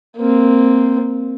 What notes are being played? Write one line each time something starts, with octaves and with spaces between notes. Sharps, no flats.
A#3 C4